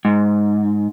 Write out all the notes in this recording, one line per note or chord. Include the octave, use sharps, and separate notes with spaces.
G#2